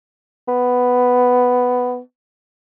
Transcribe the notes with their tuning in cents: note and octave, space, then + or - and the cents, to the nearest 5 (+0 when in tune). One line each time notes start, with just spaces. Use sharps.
B3 +5